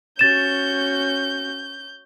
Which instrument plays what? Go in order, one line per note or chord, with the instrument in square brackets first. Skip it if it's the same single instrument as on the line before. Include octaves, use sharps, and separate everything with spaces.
[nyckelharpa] C#4 F#4 [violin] G6 [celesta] A6 E7